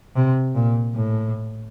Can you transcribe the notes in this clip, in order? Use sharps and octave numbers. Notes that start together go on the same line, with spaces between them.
C3
A#2
A2